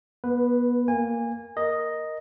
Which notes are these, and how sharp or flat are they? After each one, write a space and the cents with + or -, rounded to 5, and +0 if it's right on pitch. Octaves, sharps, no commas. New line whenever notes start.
B3 -30 B4 +0
A#3 +0 G#5 -25
A#4 +0 D#5 +0